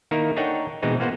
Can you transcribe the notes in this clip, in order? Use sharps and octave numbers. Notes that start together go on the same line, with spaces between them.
D#3 A#3 D#4 E4 A#4
D4 D#4 A4 C#5 F#5 G5
B2 E3 G#3 C4 D#4
A#3 B3 F4 C5 F#5